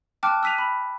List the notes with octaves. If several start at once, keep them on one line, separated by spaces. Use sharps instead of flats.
G5 A5 D6 F6 F#6
E6 F#6 B6 D#7 F7
B5